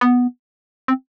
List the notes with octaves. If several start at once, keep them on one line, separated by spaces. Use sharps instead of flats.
B3
C4